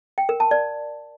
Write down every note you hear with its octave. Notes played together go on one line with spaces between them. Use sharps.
G5
A#4
A5
D5